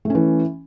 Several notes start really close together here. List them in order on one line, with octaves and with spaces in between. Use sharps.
A3 C#4 E3